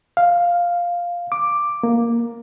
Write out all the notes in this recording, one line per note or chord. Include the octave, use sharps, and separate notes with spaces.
F5
D6
A#3